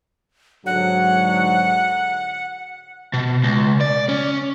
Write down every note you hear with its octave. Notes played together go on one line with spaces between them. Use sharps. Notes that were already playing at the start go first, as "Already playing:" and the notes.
G#2 D3 F#3 F#5
B2
C#2
D5
C#4